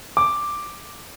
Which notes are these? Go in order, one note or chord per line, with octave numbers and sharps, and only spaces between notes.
D6